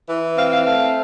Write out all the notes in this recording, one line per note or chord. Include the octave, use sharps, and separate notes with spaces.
E3
C4 F5
F5
A3 F5